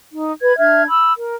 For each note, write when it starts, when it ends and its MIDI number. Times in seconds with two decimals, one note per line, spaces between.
0.11 0.32 63
0.41 0.57 71
0.41 0.57 92
0.58 0.85 62
0.58 0.85 76
0.58 0.85 89
0.58 0.85 92
0.88 1.12 83
0.88 1.12 88
1.17 1.35 70